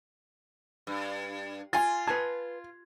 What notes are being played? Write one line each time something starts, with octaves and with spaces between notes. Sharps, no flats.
G2
F4 G#5 A6
B4 G#5 A5 G#6